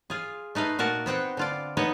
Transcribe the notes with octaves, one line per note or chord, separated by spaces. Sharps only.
F4 G#4
A3 D#4 B4 F5
A#2 F#4 A#4 A5
B3 C4 F#5 G5
D3 F4 D5
B3 D#4 B4 C#5 D#5